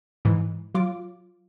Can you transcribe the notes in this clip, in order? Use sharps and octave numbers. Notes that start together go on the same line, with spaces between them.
G#2 E3
F#3 F4 D6